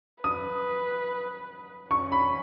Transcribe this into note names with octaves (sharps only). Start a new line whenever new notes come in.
B4 D#6
C#4 C#6
B5